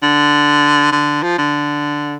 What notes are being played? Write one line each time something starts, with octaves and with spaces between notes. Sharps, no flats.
D3
D3
F3
D3